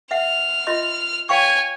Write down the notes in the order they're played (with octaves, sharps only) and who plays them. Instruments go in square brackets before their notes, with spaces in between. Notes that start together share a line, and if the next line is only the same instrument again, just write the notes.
[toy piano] E5 F#5 [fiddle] F6
[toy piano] F4 D#5 C6
[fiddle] C#5 G#5 [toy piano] F5 G5 C#6